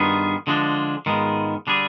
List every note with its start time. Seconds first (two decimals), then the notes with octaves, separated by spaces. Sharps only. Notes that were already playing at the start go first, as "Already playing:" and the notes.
Already playing: G2 D#3 B3 F4 G#4
0.47 D3 F3 G#3 D4
1.06 G#2 D#3 G#3 B3 F4
1.67 D3 G3 D4 G#4